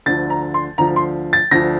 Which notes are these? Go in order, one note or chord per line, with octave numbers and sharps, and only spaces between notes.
D2 D3 F3 A6
A#5
C6
D2 D3 F3 A#5
C6
A6
D2 D3 F3 A#6